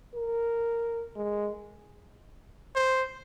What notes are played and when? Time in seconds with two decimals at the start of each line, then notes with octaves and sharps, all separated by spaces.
0.15 A#4
1.16 G#3
2.76 C5